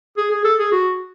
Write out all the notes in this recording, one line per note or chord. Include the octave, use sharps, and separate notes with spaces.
G#4
G#4
A4
G#4
F#4